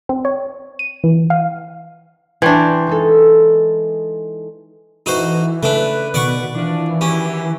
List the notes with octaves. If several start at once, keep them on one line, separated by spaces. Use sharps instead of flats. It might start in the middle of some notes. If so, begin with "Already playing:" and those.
C4
C#5
D#7
E3
F5
E3 D4 G5 C6 C#6
G#3 D#4 A4
E3 A3 D#4 F#4 B4 C5 D#5
C#3 A3 D4 B4
B2 D#3 D5 F#5 C#6
E3 F3 D4
F#3 C#4 E4 G4